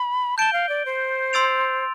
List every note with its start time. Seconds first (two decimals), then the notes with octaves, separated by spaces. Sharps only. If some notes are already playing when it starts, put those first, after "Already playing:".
Already playing: B5
0.38 A5 G6 D7 G7
0.53 F5
0.69 D5
0.86 C5
1.33 C6 E6 A6 D7 F7